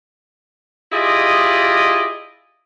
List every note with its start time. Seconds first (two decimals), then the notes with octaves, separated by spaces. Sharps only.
0.92 E4 F4 G4 G#4 D5 D#5